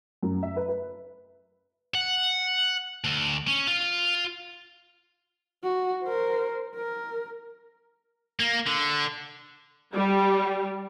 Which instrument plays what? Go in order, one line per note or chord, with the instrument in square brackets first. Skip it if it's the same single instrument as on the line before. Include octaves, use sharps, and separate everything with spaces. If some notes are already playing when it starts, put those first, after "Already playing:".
[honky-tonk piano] F#2
E5
B4
B4
[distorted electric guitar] F#5
D2
C#4
F4
[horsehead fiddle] F#4
A#4 C5
A#4
[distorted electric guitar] A#3
D3
[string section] G3